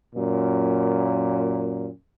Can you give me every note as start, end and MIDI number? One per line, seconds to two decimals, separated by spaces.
0.15 1.89 42
0.15 1.89 46